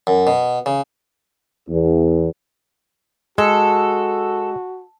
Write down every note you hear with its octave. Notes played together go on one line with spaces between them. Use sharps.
F#2
B2
C#3
E2
G#3 F#4 A4